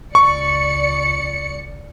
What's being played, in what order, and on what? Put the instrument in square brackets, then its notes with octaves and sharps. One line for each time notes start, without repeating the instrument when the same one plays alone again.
[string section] C#2 D5 C#7 [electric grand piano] C#6